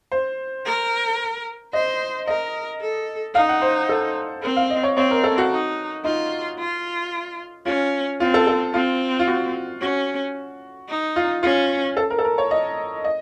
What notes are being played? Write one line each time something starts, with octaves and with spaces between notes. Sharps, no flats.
C5
A#4
C5 D#5
A#4 D#5
A4
D#4 F5
F#5
C5
A4
C4 A#4
F5
D#5
C#5
C4 C#5
A#4
A4
F#4
D#4
D#4 F4
F4
C#4 F4
C4 F4
A4
A4
C4 F4
F4
F#4
C#4 F#4
D#4
F4
C#4 F4
A4
A#4
A4
A#4
C#5
D#5
D#5